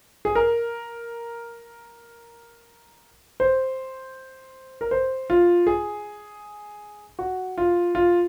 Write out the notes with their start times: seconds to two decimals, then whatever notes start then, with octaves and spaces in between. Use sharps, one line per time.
0.25 G#4
0.35 A#4
3.40 C5
4.81 A#4
4.91 C5
5.30 F4
5.67 G#4
7.19 F#4
7.58 F4
7.95 F4